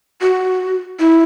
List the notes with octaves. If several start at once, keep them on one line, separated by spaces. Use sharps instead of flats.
F#4
E4